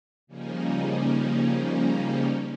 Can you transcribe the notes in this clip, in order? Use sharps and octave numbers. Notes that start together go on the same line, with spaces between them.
C#3 F3 G3 A#3 C#4 D#4